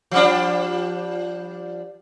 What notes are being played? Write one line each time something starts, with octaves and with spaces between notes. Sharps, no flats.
F3 G3 D4